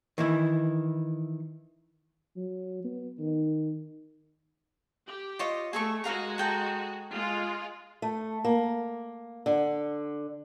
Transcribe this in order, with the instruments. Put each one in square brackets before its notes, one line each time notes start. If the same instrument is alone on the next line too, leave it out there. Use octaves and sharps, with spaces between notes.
[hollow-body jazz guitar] D#3 E3 E4
[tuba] F#3
B3
D#3
[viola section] G4
[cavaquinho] F4 C#5 D#5
[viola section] A3 [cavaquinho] G#4 A4 C#6
[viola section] G#3 F#4 [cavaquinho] A#4 F5 A#5
[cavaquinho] A4 G5 A#5
[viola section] G#3 F4
[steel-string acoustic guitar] A3
A#3
D3